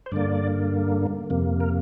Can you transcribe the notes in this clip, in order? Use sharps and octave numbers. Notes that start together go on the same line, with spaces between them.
C5
G2 D3 A#3 D5
F2 C3 A#3
A#4